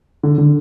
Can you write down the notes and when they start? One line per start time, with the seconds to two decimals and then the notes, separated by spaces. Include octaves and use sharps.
0.23 D3
0.38 D3